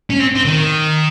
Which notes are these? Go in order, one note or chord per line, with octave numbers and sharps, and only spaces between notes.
C#4
C4
C4
D#3